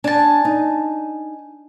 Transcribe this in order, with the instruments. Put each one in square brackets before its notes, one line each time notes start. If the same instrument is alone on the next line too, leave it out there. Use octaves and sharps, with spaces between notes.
[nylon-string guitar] D4 [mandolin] G#5 A5
[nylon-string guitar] D#4